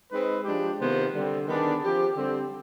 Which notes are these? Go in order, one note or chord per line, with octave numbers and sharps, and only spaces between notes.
G#3 C4 D#4 B4
F3 G#3 D4 G4
C3 D#3 B3 F4 C5
D3 G3 C4
D#3 B3 D4 G#4
F3 C4 G4
D3 G3 C4